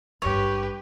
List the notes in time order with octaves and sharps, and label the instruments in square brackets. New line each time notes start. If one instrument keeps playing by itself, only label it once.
[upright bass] G#1 G2 [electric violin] G4 B4 [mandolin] C#5